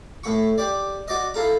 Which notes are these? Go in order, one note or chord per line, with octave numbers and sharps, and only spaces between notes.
A2 B5 C#6
G4 D5
F#4 D5 D#5
E4 F4 A4 A#5